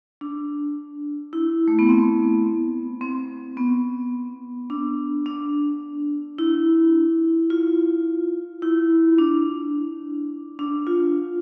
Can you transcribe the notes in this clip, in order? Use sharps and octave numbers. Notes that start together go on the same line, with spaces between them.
D4
E4
A3
B3
C4
C4
B3
D4
D4
E4
F4
E4
D4
D4
F4